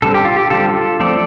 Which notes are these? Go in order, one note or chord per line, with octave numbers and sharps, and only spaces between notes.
D3 G3 C4 A4
G4
F4
G4
D3 G3 C4 F4 A4
F3 A3 C4 A4 D5